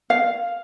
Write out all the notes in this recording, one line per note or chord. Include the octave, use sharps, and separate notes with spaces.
F5